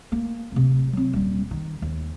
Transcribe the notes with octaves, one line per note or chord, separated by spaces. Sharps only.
A#3
D1 C3
F#3 C4
D#1 G3
D#3
D#2